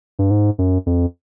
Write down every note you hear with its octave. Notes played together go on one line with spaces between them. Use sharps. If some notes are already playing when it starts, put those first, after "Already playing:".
G2
G#2
F#2
F2